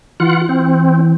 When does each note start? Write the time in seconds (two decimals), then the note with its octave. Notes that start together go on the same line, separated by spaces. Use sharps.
0.20 E3 F4 F#5
0.49 C4